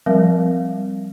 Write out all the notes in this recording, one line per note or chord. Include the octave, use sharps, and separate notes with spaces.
F3 G3 C4 A#4 F5